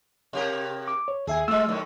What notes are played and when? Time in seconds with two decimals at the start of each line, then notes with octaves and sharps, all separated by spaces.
0.33 C3 G4 A#4
0.88 D6
1.08 C#5
1.27 D#2 G#4 E5 G#5
1.48 G3 A3 F4 E6
1.68 F#2 A2 D#3